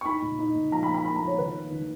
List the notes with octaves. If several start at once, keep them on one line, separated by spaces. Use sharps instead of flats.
C#6
D#4 B5
A#2
D#4
A#2
F3 A#5
B5
A#3
B5
A#3 B5
A#5
F3
C#5
D#3 B4
A#3
D#3